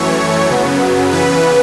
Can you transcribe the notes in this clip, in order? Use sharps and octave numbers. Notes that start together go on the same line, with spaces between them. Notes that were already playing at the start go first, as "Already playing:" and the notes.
Already playing: F#2 E3 A3 C#5
F#2 C#3 F#3 B3
C#3 E3 B3 B4